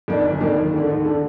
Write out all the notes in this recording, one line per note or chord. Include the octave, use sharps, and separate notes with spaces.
F2 D#3 A#3 D4
G1
F2 D#3 A#3 D4
D#2
D3 A3
D#2
D3 A3